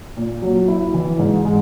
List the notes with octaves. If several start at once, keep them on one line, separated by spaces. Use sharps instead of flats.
A#2
F#3
E4
E3
G#2
G#3